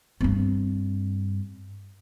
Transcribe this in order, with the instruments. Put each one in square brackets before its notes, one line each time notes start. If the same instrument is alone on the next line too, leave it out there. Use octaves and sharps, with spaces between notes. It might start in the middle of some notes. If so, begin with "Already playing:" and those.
[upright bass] G2 C4